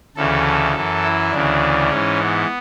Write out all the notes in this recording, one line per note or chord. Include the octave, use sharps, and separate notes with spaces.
D2 C#3 E3 A4
F#2 E3
E4
D2 C#3 E3 D4
G#2 E3 C#4
B3